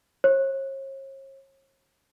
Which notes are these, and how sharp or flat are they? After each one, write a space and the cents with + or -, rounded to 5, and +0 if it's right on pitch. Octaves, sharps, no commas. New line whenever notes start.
C#5 -45